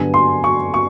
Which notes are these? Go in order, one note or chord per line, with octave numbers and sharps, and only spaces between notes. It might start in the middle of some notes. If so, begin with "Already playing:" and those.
Already playing: G2 D3 F#3 B3 G#5
C6
C#6
C#6